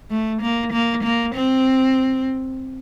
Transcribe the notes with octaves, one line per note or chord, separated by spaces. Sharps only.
A3
A#3
A#3
A#3
C4